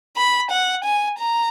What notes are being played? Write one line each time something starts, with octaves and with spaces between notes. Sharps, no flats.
B5
F#5
G#5
A#5